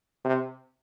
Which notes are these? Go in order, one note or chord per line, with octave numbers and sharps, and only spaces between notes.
C3